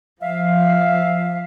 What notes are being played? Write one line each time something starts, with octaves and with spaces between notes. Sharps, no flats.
F3 E5 F5